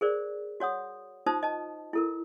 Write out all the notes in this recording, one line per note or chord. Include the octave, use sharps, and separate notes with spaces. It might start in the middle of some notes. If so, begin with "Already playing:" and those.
G#4 A#4 C5 D5
F#4 C#5 F#5 D#6
D#4 F4 C5 A5 D#6
D#5 A5
E4 A4 A#4